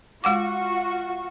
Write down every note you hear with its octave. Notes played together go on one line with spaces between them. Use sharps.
G#3 F4 F#4 F#5 C#6 D6